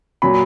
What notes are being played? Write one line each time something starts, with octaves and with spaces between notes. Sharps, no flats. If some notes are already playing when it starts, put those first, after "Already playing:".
A#2 F#3 B5